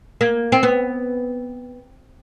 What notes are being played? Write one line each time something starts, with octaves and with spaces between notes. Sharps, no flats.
A#3
C4
B3